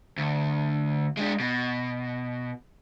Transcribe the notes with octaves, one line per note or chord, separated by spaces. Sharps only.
D2
G#3 D4
B2